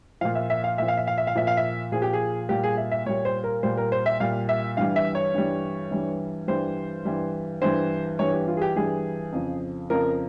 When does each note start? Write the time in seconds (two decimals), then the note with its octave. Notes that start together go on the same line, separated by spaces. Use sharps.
0.21 A#2 F3 F5
0.35 E5
0.50 E5
0.64 F5
0.78 A#2 F3 E5
0.88 F5
0.97 E5
1.07 F5
1.18 E5
1.27 F5
1.35 A#2 F3 E5
1.47 F5
1.57 E5
1.92 A#2 F3 G#4
2.02 G4
2.13 G#4
2.49 A#2 G3 G4
2.63 G#4
2.77 E5
2.91 E5
3.06 A#2 G3 C#5
3.25 C5
3.44 A#4
3.63 A#2 G3 C5
3.77 A#4
3.92 C5
4.06 E5
4.20 A#2 G3 F5
4.49 E5
4.77 G2 E3 G3 F5
4.96 E5
5.15 C#5
5.34 G2 E3 G3
5.91 G2 E3 G3
6.48 G2 E3 G3 C5
7.05 G2 E3 G3
7.62 G2 E3 G3 C5
8.19 G2 E3 G3 C#5
8.33 G4
8.48 F4
8.57 G#4
8.62 G4
8.76 G2 E3 G3 G#4
9.32 F2 C#3 F3
9.90 F2 C#3 F3 A#4